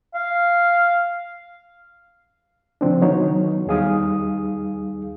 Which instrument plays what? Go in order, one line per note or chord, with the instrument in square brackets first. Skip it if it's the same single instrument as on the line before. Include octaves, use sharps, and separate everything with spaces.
[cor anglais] F5
[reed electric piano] C#3 F3 C4 D4
D#3 F#3 B3 D#4 C#5
D#2 G3 D#4 G#4 F5 D#6